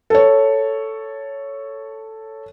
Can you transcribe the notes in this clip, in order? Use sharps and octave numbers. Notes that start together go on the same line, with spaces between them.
A4 C#5